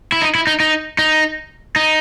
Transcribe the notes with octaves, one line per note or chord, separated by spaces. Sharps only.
E4
D#4
E4
D#4
D#4
D#4
D#4